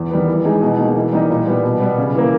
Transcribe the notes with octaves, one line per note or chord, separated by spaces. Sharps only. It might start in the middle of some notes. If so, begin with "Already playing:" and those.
Already playing: E2
D#3 G3 B3
E3
G#3 D#4 G#4
B2
A#3 D#4 G#4
E3
G3 A#3 D#4 G4
A#2
G3 B3
B2
G3 B3
C#3
E3 A#3